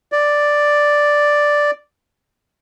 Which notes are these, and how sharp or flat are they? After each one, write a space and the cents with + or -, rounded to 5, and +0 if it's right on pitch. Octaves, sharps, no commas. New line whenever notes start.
D5 +0